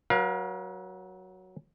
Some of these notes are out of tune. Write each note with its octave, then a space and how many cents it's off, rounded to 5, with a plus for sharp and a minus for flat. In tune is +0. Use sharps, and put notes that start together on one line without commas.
F#3 +0 A#4 +45 F5 +15